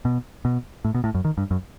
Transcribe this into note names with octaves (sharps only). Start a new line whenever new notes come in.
B2
B2
A2
B2
A2
F#2
D#3
G2
F#2